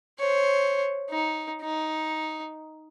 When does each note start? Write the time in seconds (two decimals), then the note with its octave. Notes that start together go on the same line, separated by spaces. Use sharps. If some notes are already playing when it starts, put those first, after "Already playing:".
0.19 C5 C#5
1.10 D#4
1.62 D#4